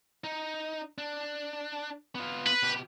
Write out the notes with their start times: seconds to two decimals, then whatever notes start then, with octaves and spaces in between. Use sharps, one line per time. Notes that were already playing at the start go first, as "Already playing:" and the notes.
0.24 D#4
0.98 D4
2.15 B3 F4
2.46 B4
2.63 B2 G4